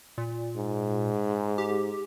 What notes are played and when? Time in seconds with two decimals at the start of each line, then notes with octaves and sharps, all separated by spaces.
0.18 A#2
0.56 G#2
1.58 G4